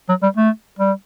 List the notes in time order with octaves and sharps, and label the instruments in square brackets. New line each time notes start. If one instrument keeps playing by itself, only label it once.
[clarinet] F#3
G3
A3
G3